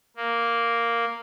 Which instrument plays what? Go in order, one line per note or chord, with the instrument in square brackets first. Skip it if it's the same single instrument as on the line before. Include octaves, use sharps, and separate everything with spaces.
[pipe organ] A#3